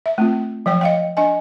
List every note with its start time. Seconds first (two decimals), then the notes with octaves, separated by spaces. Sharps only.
0.06 E5
0.18 A3 C4 F4
0.66 F3 F#3 C#5 G5
0.81 D#5 F5 G5
1.17 D4 D#5 G#5